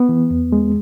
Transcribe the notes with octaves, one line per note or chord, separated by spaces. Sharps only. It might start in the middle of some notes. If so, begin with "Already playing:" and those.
Already playing: B3
E3
E2
G#3